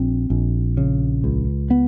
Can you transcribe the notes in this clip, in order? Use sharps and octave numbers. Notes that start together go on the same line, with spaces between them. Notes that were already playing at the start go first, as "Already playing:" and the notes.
Already playing: A#1 C4
A#1
C#3
C#2
B3